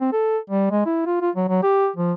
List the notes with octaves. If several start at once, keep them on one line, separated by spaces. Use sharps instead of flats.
C4
A4
G3
G#3
E4
F4
F4
F#3
F#3
G4
F3